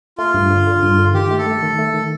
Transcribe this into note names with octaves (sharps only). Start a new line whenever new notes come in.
A3 F4
G2
D3
D3
G2
D3
D#3 G4
A3
A4
A3
D#3
A3
D#3